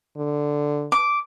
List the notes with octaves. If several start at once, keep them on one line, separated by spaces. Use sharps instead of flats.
D3
D6